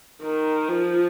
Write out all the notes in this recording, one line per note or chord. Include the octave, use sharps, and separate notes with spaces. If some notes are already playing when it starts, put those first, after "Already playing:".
D#3
F3